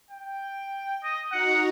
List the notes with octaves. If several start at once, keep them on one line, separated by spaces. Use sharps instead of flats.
G5
D#5
D#4 F#4 F#5 A#5